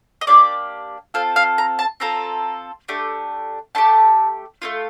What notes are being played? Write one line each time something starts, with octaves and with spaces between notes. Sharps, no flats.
D#5
A#3 D4 G4 D5
C4 F4 A4 F5
F5
A#5
A5
C4 F4 A4 A#5
A3 D4 G4
A3 D4 G4 A5
A3 C4 F4